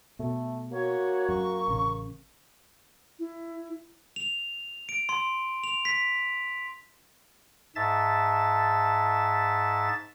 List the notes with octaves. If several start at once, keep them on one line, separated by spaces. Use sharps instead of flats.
B2 A3
A#3 F#4 C#5
F#2 C#6
A1 C#3
E4
F7
D7
C6
F7
B6
G#2 E5 A5 A6